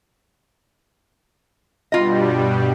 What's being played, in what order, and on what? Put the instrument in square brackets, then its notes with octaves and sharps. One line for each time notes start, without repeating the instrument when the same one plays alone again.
[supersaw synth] G2 B2 G3 [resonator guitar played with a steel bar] F4 D#5